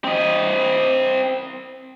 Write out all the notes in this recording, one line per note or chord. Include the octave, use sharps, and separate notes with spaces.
C4 D#5